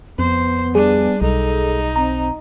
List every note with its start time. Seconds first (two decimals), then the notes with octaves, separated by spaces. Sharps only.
0.19 F2 B3 C5
0.75 G3 D4 G#4
1.22 B1 D#4 A4
1.96 C4 A#5